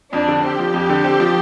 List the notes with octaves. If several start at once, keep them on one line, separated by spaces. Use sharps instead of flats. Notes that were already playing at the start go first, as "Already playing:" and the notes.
F2 D4
D3
C4 G4
F3
F2
D3
C4
F3